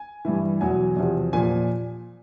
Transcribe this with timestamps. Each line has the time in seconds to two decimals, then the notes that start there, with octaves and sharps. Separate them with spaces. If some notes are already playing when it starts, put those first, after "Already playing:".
Already playing: G#5
0.25 G2 E3
0.61 E2 B2 F#3 G#5
0.96 E2 C3 F3
1.33 A#2 F3 G#5